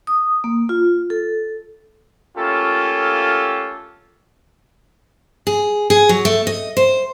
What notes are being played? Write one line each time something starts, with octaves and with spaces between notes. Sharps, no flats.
D#6
A#3
F4
A4
A3 A#3 C#4 F4 G4 A4
G#4
G#4
F#3
A3
D#5
C5